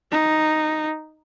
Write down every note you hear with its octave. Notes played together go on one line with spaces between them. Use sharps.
D#4